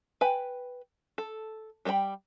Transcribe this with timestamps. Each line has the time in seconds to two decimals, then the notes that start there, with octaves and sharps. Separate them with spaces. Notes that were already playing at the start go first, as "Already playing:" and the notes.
0.21 B4 G5 G#5 B5
1.18 A4
1.85 G3 A4 A#4 G5 B5